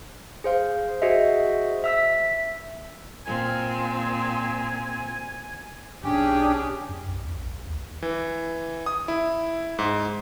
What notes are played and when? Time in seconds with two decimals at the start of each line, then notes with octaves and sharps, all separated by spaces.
0.44 G#4 C5 F5
1.02 F#4 G#4 C5 D#5 E5
1.84 E5 E6 B6
3.26 A#2 C4 G#5
6.04 B1 C#4 D4 G4 G#4 G5
6.89 F#2
7.07 B1
7.24 E2
7.38 A#1
7.50 A#1
7.67 D#2
8.02 E3
8.86 D#6
9.08 E4
9.79 G#2